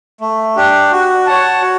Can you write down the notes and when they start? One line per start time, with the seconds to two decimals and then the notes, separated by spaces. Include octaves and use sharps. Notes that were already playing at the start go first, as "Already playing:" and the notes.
0.21 A3
0.56 D4 G4
0.92 F#4
1.26 C#5 F#5 A5
1.62 F#4